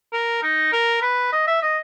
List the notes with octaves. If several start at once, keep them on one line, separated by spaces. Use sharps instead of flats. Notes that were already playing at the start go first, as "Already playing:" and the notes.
A#4
D#4
A#4
B4
D#5
E5
D#5